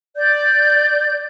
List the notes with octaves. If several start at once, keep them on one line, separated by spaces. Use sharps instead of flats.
D5 G6